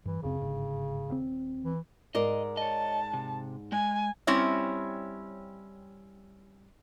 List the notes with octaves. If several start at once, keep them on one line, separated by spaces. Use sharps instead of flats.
G2 E3
D1 F#2 C#3 C4
G1 G#2
D#1 A2 C4
E3
G#2 A#4 D5 D#5
C#5 D#5 A5
C3
G#3 G#5
G3 C4 C#4 E4 C#5 E5